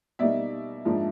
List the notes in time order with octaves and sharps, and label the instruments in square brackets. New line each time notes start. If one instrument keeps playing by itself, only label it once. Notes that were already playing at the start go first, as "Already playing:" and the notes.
[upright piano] B2 G3 A#3 D#4 D5 E5
G#2 F3 A#3 D4